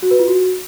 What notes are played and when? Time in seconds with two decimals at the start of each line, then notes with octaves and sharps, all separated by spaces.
0.02 F#4
0.11 B4
0.19 F4
0.27 F#4